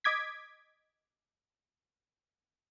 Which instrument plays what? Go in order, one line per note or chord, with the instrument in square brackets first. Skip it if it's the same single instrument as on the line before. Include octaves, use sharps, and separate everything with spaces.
[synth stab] D#5 D6 G#6 B6